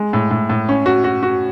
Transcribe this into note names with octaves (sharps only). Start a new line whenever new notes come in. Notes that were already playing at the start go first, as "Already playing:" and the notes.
Already playing: G#3
A2
A2
A2
C#4
F#4
F#4
F#4